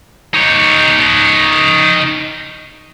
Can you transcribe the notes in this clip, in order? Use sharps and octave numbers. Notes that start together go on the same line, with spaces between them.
D#4 C#5